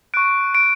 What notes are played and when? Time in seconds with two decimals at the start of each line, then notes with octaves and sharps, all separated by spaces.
0.14 C#6 F#6 D7
0.55 D7